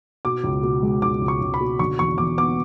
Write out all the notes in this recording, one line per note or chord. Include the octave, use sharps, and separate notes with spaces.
B2 D6
C#2
B2
G#3
C#2 D6
C#2
C#6
C#2
B5
B2
D3 C#6
E2 C#6
E2 D6
B3 D6